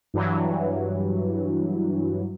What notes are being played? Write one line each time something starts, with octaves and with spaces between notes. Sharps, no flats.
G2 E3 F#3